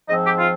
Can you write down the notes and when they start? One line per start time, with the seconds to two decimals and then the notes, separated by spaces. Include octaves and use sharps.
0.08 G#2 F3 C4 D#5
0.23 G4
0.38 F4